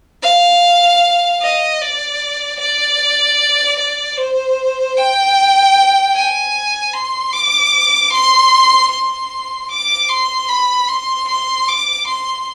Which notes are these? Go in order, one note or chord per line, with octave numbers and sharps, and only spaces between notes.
F5
D#5
D5
D5
D5
C5
G5
G#5
C6
D6
C6
C6
D6
C6
B5
C6
C6
D6
C6